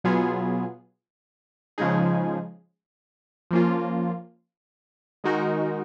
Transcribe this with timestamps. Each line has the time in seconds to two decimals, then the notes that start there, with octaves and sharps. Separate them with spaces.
0.04 B2 F#3 B3 F4 G#4
1.78 C#3 F3 G#3 D#4 G#4
3.51 F3 A#3 C#4 F4
5.24 D#3 G#3 D#4 F#4 A#4